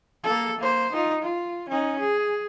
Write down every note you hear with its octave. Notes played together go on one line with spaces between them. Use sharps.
A#3 A4
A#3 C5
D#4 F4
F4
C#4 D#4
G#4